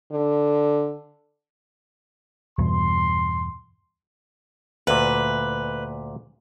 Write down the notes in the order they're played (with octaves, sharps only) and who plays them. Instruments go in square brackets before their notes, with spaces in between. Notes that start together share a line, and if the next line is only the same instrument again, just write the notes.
[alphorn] D3
[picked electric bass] E2 G2 B2 [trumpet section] C6
[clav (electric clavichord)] D2 A#2 [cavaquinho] B4